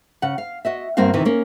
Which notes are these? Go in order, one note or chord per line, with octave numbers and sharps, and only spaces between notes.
C#3 F#5
F5
F#4 D#5 E5
G2 A#3 C4 F#4 F5
C3 D#3 E3
A#3 C#4